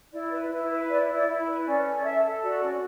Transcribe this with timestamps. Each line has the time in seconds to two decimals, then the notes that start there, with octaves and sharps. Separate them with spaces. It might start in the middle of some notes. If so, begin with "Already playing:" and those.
0.12 E4 D5
0.31 B4
0.50 E4
0.69 B4
0.89 E4 D5
1.08 E4
1.14 D5
1.27 E4
1.46 B4
1.65 C#4 D5
1.84 A4
1.95 D5
2.04 A4 E5
2.22 A4
2.42 F#4 D5
2.61 C#4